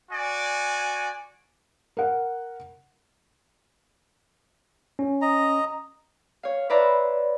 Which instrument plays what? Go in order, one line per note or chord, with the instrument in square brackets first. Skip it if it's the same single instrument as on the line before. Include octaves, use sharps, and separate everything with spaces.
[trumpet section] F#4 D5 G#5
[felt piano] A#4 F#5
[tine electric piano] C#4
[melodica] D#5 A#5
[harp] C#5 F5
B4 C#5 D5 E5 A#5 C6